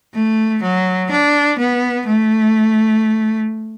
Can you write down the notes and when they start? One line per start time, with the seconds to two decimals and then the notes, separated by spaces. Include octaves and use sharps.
0.14 A3
0.63 F#3
1.11 D4
1.59 B3
2.07 A3